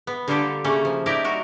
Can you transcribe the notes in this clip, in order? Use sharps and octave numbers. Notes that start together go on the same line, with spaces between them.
B3
D3 G3 A#3 F4 G4 A4
C#3 A3 A#3 C#4 A4
F3
D#4 E4 G4 A#4 D5
G3 F#4 A#4